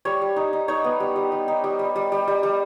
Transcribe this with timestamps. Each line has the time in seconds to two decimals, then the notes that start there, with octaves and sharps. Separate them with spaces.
0.05 G3 C#5
0.22 G3
0.36 D#4
0.53 D#4
0.68 D#4 C#5
0.84 B3
1.00 G3
1.16 G3
1.32 G3
1.48 D#4
1.64 G3
1.79 G3
1.96 G3
2.12 G3
2.28 G3
2.43 G3